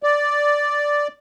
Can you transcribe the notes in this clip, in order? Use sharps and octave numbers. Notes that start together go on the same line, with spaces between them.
D5